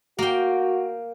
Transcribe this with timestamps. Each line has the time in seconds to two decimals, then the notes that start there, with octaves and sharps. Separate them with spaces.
0.19 A#3 F#4 G5